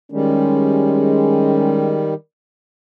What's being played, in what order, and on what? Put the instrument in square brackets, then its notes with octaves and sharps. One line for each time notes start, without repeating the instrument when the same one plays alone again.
[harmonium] D#3 G3 [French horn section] G#3 [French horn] C#4